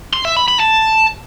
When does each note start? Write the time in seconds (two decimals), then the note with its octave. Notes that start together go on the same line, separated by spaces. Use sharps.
0.13 C6
0.25 E5
0.36 B5
0.48 B5
0.59 A5